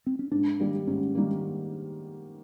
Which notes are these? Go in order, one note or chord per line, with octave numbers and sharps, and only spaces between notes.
C4
C#4
G#2 D4
D#3 G3 A#3
G#2 C#4
D#3 G3 A#3